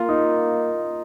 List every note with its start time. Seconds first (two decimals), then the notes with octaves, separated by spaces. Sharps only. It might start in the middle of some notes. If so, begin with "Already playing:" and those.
Already playing: A#3 F4
0.09 D#4